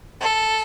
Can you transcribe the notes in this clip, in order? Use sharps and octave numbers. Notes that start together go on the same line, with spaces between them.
A4